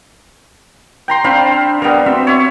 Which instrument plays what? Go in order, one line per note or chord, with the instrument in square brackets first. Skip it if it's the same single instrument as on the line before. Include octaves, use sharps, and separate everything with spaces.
[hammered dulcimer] G5 A#5 C6
[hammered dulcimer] C4 F5 B5 [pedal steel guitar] D4
[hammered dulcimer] G3 B3 [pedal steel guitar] A#4 F6
[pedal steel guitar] C4 F#4 C6 [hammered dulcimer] E5
[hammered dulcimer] C#5 E5